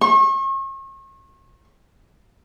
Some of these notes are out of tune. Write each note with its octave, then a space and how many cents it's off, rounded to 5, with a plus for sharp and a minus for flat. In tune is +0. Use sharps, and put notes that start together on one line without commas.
C#6 -40